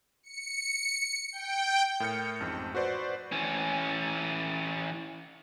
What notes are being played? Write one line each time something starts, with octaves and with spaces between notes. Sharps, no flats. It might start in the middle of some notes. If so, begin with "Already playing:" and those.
C#7
G5
A2 A#4 G5 F6 G6 C#7
A1 F2 G#2
F#4 B4 C5 D5
E3 C#4